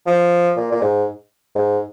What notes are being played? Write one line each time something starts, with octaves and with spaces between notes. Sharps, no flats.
F3
A#2
A#2
G#2
G#2